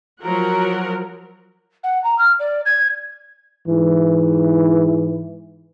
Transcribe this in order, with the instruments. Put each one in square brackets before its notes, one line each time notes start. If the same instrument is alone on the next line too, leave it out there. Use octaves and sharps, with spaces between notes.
[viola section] F3 F#3 A#4 F#5
[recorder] F#5
A#5
F6
D5
G#6
[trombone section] G#2 E3